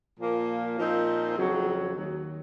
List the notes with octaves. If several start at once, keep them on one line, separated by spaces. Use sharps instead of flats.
A#2 F3 A#3
A#2 F3 C4 D#4
F2 C#3 F#3
D#2 D#3 F#3